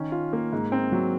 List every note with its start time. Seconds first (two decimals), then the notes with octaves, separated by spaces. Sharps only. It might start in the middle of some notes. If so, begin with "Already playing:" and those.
Already playing: D#3 C#4
0.12 F4
0.33 A#3
0.53 G#2
0.72 C4
0.92 F#3